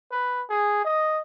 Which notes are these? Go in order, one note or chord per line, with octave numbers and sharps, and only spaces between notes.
B4
G#4
D#5